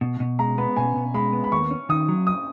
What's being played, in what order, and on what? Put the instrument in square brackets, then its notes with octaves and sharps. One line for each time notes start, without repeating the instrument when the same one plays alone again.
[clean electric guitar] B2
B2
[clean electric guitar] G#3 [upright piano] A#5
[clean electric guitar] B3 [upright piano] B5
[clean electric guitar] B2 [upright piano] G#5
[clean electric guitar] B2
[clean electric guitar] G#3 [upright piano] B5
[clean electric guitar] B3
[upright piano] B5
[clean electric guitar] D#2 [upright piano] C#6
[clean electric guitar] C#4
[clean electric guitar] D#3 [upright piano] D#6
[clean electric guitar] F#3
[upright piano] D#6